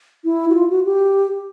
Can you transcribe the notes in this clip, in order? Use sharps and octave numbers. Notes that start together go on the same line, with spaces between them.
E4
F#4
F4
F#4
G4